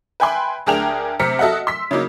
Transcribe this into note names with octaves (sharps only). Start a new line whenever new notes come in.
B4 E5 G5 G#5 B5 C6
D2 D4 G#4 A#4 G5 F7
C3 C4 A#5 F6 B6 C#7
F#4 A4 D#5 E5 F#5
C6 E6 B6
C#3 F#3 A#3 D#4